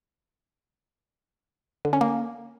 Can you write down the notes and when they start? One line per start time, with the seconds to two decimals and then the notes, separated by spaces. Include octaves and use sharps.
1.85 D3
1.93 C#4
2.01 A#3